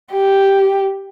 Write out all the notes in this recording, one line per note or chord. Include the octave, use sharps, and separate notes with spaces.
G4